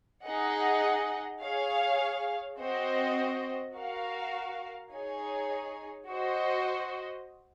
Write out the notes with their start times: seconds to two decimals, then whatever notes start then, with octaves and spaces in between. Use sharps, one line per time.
0.24 D#4 G#4 D#5 F#5
1.41 G#4 C#5 F5
2.58 C4 F#4 C5 D#5
3.74 F#4 A#4 F5
4.91 D#4 G#4 C#5 G#5
6.08 F#4 C5 D#5